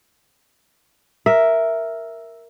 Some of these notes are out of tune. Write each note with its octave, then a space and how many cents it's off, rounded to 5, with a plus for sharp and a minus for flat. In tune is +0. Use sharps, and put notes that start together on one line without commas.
A#4 +0 E5 +0